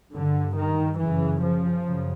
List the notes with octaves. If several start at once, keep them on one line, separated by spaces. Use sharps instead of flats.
G2 D3
D#3
F#2 C#3 E3
F3
F#2 C#3